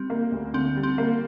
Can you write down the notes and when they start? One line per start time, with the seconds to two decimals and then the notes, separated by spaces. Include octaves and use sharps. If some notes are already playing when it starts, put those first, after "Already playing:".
Already playing: G3 C4
0.10 A#3
0.32 D2
0.54 D3 C4
0.76 G3
0.83 C4
0.98 A#3